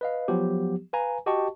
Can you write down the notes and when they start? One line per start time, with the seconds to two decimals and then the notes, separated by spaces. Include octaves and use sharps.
0.01 B4 D#5 F5
0.28 F3 F#3 B3 G4
0.93 B4 F5 G#5 A#5
1.26 F#4 G4 D#5 G5 A5 C#6